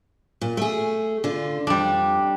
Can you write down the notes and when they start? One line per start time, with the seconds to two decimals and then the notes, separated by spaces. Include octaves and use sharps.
0.41 A#2
0.57 A3 G#4
1.24 D3 F4
1.67 F2 G3 D4